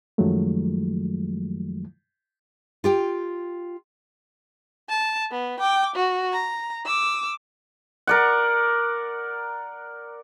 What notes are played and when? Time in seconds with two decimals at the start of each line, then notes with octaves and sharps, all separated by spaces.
0.18 F#2 D#3 F3 F#3 G#3 A3
2.84 F4 G4 G5
4.89 A5
5.31 B3
5.60 G5 D6
5.96 F#4
6.33 A#5
6.86 D6 E6
8.07 A#4 D5 F#5